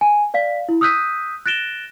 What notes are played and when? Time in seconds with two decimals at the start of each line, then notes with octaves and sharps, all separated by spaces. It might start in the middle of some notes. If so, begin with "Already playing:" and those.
0.01 G#5
0.34 D5 F5 B6
0.69 E4
0.81 D#6 E6 F#6 G6 B6 D#7
1.46 F#6 A6 A#6 D7 E7 G7